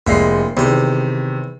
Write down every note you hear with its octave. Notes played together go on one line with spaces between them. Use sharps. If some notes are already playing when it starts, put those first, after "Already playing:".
F1 A#2 G#3 E5 C7
E2 C3 D#3 G4